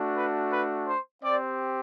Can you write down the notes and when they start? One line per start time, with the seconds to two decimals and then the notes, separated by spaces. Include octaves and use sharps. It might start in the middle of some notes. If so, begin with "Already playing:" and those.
Already playing: A3 D4 F#4
0.14 B4
0.51 B4
0.87 C5
1.24 C4 G4 D5